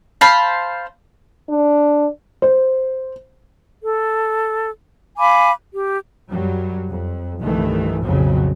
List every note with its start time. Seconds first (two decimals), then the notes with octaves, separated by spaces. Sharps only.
0.21 C5 F5 A5 B5
1.50 D4
2.42 C5
3.82 A4
5.18 F5 G#5 B5 D6
5.72 G4
6.31 F#2 F#3 G3
6.88 F2
7.41 C2 G2 D#3 E3 A3
8.01 B1 F2 A2 C#3 F3 F#3